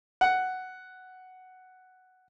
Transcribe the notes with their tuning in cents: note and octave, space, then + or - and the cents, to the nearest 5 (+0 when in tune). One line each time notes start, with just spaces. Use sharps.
F#5 +5